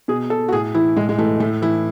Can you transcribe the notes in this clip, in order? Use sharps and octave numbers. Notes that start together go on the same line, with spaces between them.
B2 G#4
A4
F#4
A2 G#4
E3 E4
A2 G#3
G#3
E3 A3
A2 A3
E3 E4